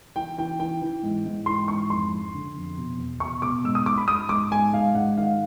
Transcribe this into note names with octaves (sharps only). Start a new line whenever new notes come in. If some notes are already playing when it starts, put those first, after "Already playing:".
E3 G5
E3 G5
E3 G5
E3
G#2
G#2
E3 C6
G#2 C#6
F2 C6
F3
D3
F2
B2
E2
B2 C#6
B2 D6
G#2 E6
D#6
G#2 D6
B5
G#2 D#6
G#2 D6
G#2 G#5
G#2 F5
G#2 F#5
D#3 F5